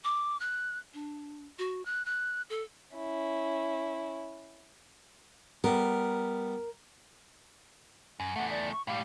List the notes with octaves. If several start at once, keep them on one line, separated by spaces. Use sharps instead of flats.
D6
F#6
D4
F#4
F#6
F#6
A4
C#4 E4
G3 B3 A#4
F#2
E2 A3 F#5
D5
C#6
A2 G3 F5